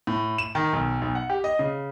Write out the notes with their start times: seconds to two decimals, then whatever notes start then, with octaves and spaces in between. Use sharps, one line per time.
0.07 A2
0.38 E7
0.55 D#3
0.73 B1
1.01 B1
1.15 F#5
1.30 G4
1.44 D#5
1.59 C#3